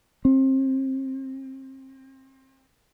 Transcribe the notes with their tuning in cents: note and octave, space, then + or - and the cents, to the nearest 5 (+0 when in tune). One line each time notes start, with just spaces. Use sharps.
C4 +30